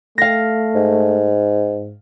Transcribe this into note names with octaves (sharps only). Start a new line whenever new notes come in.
A3 F5 A#6
G#2